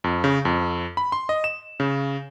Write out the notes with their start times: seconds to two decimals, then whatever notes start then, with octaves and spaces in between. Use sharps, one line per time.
0.04 F2
0.24 C#3
0.45 F2
0.97 B5
1.12 C6
1.29 D#5
1.44 E7
1.80 C#3